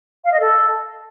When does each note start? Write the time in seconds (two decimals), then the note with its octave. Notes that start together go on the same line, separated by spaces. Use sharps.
0.23 F5
0.31 D#5
0.39 A4